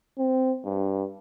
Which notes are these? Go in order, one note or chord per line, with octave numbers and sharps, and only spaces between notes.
C4
G2